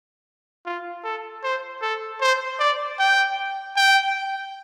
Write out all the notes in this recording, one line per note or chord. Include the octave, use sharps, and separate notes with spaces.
F4
A4
C5
A4
C5
D5
G5
G5